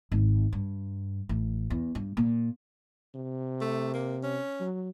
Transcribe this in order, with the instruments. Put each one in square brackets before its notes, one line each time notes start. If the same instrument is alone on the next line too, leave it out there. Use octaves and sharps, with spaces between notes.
[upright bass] G#1
G2
A1
E2
G2
A#2
[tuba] C3
[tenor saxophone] A3
A#3
C#4
[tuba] F#3